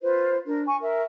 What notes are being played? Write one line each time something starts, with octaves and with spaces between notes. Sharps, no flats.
F4 B4 C5
D4 A#4
G#5 C#6
A#4 E5